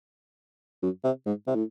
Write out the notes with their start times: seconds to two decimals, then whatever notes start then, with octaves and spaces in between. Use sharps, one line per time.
0.83 F#2
1.04 C3
1.26 G#2
1.47 C3
1.55 A2